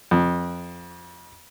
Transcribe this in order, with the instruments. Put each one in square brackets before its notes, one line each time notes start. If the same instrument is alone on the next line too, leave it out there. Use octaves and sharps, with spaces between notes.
[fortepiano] F2